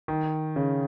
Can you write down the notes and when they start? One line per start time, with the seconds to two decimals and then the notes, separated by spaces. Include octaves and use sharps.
0.08 D#3
0.56 C#3